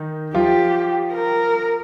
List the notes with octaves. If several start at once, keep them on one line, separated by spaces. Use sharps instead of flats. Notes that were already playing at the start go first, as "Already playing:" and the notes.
Already playing: D#3 D#4
F3 F4 G4
A#4